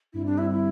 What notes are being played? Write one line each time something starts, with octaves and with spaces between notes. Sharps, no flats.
G2 D3 G3 C4 E4
D4
E4
E4